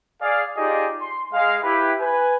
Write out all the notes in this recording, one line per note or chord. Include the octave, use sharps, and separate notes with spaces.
G#4 D5 F5
D#4 F4 G4 G#4 D5 D#5
C6
G#3 F5
E4 G4 B4
B4 G#5